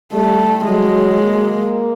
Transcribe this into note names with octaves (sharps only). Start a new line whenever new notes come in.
G3 A3
F#3 G#3
A#3